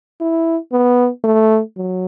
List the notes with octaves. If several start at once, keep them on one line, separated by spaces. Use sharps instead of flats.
E4
B3
A3
F#3